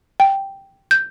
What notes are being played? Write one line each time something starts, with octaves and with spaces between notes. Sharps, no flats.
G5
G6